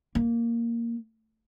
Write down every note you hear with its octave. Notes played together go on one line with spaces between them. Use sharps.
A#3